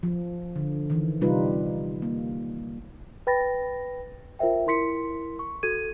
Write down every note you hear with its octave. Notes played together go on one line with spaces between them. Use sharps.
F3
D3
D#3 E3
C3 G3 D#4 F4 B4
A#3
B4 G5 B5 A6 A#6
F4 A#4 C5 E5 G5
E4 A#4 C6 B6 C#7
C#6
F#4 A4 G#6 D#7